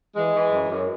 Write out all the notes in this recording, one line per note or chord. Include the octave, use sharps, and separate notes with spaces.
E3 G#3
E3
F#2
F#2